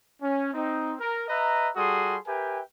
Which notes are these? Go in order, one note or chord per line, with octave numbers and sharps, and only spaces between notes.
C#4
C4 D#4
A#4
B4 D#5 E5 A#5
G3 F#4 G#4 A4 C6 D#6
G4 A#4 B4 E5 G5 G#5